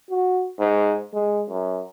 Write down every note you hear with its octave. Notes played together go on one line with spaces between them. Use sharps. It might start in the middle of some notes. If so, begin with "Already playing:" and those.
F#4
G#2
G#3
F#2